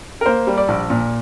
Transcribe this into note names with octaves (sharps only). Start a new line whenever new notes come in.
A#4
A#3 C5
G3
D5
A#1
A#2